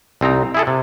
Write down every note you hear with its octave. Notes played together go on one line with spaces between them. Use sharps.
C2 C4 D#4 A#5
E4 G#4 A4
C3